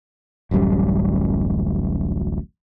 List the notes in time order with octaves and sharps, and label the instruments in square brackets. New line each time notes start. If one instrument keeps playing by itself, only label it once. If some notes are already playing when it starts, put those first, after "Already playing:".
[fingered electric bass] D1 A1 F#2 G3